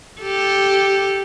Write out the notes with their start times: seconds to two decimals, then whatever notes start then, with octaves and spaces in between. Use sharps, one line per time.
0.22 G4 A4